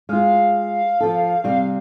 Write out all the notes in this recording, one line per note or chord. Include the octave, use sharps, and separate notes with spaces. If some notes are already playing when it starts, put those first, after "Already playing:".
G#3 F4 F5
F3 A4
C3 G3